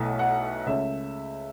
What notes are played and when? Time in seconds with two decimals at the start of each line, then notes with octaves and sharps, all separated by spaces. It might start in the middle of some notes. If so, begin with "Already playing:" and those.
Already playing: B1 B2 A3 E4
0.19 F#5
0.66 C#2 C#3 A3 C#4 E5